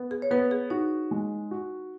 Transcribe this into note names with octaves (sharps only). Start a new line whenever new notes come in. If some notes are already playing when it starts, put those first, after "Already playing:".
Already playing: B3
G#4
C#5
B3 B4
G#4
D#4 F#4
G#3
F#4